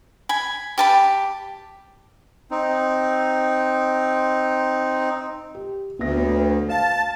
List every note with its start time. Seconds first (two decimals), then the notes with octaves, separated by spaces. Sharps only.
0.29 G#5 B5
0.78 G4 A5 B5
2.51 C4 D#4
5.55 G4
5.99 D2 B3 E5 A#6
6.17 D4 B4 C#5
6.69 F5 A5